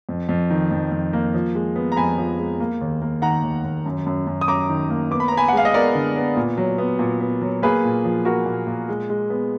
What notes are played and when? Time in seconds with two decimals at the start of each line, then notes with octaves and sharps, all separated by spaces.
0.09 F2
0.29 F2
0.50 D#3
0.71 F2
0.92 F2
1.13 A#3
1.34 F3
1.55 G#3
1.76 B3
1.92 A#5
1.97 F2 G#5 B5
2.18 F3
2.39 G#3
2.60 A#3
2.81 D#2
3.02 A#3
3.22 D#3 F#5 A#5
3.43 D#2
3.64 D#2
3.86 F#2
4.06 F#2
4.27 F#2
4.41 D#6
4.48 F#2 A#5 D6
4.70 D#3
4.90 A#3
5.11 B3 D6
5.20 B5
5.28 A#5
5.32 B3
5.37 G#5 B5
5.48 F#5
5.53 G#3 F5
5.65 D#5
5.73 B3 A#4 D5
5.95 D3
6.16 B3
6.37 A#2
6.57 F#3
6.78 B3
6.99 A#2
7.21 B3
7.41 F#3
7.62 A#3 G#4 B4
7.84 A#2
8.04 F3
8.25 A#3 F#4 A#4
8.46 A#2
8.67 A#2
8.89 G#3
9.10 G#3
9.30 B3